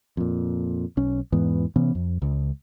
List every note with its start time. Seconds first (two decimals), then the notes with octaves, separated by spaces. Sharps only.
0.17 F2 A#2
0.97 B1 C#4
1.32 E2 G#2 E3 B3
1.76 C3 E3 B3 C#4
1.95 F2
2.22 C#2